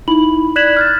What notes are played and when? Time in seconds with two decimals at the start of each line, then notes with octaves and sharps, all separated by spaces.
0.08 D#4 E4 B5 F#7
0.56 D5 F#6 G#6 B6 E7 F#7
0.77 F6 F#6 A6